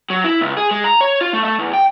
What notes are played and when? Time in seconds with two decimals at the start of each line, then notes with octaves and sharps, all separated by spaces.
0.10 F#3
0.24 E4
0.41 C#2
0.57 G#4
0.71 G#3
0.84 A#5
1.01 C#5
1.21 F4
1.33 A3
1.45 A3
1.59 E2
1.74 G5